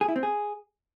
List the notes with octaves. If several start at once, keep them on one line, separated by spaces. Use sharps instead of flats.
G#4
E4
C4
G#4